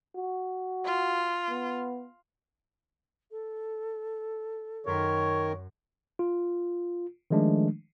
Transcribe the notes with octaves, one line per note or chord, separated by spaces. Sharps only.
F#4
F4
B3
A4
F#2 D#3 A#4 C#5 C6 B6
F4
D#3 F3 G#3 A3 D4